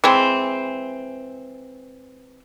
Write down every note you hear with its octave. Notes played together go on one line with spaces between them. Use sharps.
E3 G#3 C4